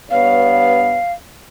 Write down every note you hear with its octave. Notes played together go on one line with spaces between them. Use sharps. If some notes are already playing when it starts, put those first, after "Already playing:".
G2 B3 C#5 F5